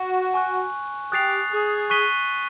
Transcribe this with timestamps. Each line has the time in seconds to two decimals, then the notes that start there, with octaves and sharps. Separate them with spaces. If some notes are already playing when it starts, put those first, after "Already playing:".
Already playing: F#4
0.34 G#5 C#6 F#6
1.12 G4 D#6 F#6 A6 C7 F7
1.51 G#4
1.90 C#6 F#6 B6 D#7 G7